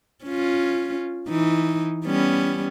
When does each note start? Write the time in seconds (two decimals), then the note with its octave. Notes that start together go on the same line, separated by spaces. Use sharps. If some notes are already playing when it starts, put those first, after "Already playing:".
0.25 C#4 F4
1.29 E3 D#4
2.05 G3 B3 C#4